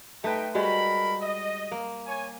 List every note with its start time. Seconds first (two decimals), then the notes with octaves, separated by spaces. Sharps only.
0.24 A3 D#4 B4 G5
0.55 G3 G#3 F#4 A#4 B5
1.22 D#5
1.71 A#3
2.06 C#5 G#5